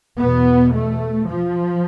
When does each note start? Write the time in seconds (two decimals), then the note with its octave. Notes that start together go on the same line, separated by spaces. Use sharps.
0.20 E2 B2 B3
0.75 A3
1.29 F3